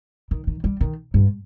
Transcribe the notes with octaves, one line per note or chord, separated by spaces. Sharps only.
D#3
D#3
G3
D#3
G2